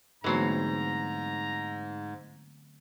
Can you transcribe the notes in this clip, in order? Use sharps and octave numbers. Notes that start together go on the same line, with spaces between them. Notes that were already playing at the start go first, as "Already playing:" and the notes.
G#2 D3 E3 F#3 A3 B3 C4 A#5